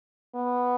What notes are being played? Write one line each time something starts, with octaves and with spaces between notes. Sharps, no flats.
B3